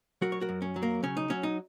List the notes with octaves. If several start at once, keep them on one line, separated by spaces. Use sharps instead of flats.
F#3 F#4 A#4
C#5
F#4 A#4
F#2
C#4
F#3
A#3
C#3 C#4
D#4
F#3 C#4
D#4